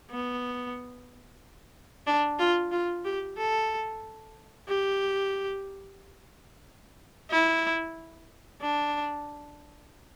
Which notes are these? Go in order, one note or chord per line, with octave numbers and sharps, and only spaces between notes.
B3
D4
F4
F4
G4
A4
G4
E4
D4